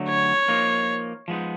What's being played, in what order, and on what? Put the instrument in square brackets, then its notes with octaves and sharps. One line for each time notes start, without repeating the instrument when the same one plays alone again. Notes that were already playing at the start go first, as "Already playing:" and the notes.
Already playing: [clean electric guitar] D3 F#3 A3
[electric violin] C#5
[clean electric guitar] F3 A#3 D#4
F3 G#3 B3 D#4